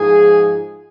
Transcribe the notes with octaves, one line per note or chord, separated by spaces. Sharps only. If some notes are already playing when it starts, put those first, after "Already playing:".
Already playing: G#2 F3 G#4